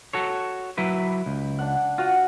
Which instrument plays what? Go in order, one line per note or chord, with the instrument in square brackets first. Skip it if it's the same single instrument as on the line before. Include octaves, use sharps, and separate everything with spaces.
[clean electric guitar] F#4 A4 C#5
F#3 E4 B4
C#2
[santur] D4 F#5
[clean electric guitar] F4 [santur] F#4 F#5